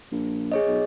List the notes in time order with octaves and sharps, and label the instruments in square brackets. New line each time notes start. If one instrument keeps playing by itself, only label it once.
[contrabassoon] A#1
[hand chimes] G#4 C#5 D#5
[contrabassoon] B1